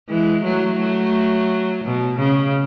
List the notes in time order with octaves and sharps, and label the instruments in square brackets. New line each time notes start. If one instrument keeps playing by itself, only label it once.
[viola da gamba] E3 G#3
F#3 A3
F#3 A3
B2
C#3